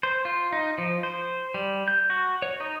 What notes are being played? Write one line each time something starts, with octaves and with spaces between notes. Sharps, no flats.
C5
F4
D#4
F3
C5
G3
G6
F#4
C#5
D#4